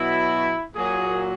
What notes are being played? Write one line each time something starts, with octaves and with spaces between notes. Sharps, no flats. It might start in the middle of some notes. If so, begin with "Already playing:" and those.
Already playing: B2 F#3 E4
A#2 F#3 G#4